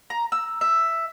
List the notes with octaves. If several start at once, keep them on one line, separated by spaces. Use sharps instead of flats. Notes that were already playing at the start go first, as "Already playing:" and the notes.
A#5
E6
E5